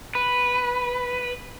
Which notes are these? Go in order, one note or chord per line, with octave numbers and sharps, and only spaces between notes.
B4